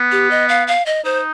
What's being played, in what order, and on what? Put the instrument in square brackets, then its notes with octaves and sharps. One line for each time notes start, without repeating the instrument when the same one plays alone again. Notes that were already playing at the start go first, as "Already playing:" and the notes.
Already playing: [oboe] B3
[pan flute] G4
D#5
F5
F5
D#5
[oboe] D#4 [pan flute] C5